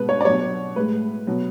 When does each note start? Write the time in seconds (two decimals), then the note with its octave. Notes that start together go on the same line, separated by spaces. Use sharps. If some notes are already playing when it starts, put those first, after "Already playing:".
Already playing: B2 G#3 B4
0.09 C#5
0.21 D5
0.25 B2 F#3 C#5
0.76 A2 G#3 B4
1.27 B2 F#3